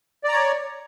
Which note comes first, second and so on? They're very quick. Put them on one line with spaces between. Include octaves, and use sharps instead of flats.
D5 A#5 C#5